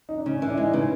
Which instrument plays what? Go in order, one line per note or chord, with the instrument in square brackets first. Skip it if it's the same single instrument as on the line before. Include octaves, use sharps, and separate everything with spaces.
[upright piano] D#4
D4
[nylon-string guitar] C#3 [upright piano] C#4
[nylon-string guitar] E3 [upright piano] C#4
[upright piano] D4
[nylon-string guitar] G#3 [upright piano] D#4
[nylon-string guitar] C#3 [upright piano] B3